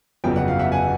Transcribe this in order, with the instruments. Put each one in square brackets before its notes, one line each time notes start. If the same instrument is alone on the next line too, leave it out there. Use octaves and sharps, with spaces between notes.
[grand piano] G1 F2 C#3 F#3 B3 G5
F#5
F5
E5 F#5
F#5 G#5